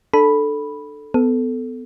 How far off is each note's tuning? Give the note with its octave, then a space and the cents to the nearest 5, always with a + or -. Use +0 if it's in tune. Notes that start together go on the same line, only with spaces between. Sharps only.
D4 +30 A4 +0 B5 -5
B3 +25 A4 +0